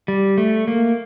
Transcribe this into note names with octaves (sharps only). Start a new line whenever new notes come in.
G3
A3
A#3